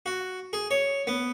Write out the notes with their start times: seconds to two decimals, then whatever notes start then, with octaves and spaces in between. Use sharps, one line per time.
0.06 F#4
0.53 G#4
0.71 C#5
1.07 B3